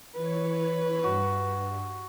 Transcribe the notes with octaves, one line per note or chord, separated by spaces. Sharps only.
E3 B4 C#5
G2 F#4